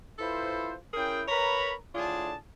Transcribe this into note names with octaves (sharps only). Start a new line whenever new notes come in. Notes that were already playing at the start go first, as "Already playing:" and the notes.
E4 F4 A4 B4 C5
C#4 E4 G#4 A#4 G5
A#4 B4 C#5 A#5 B5
A2 D3 D4 F4 G#4 A5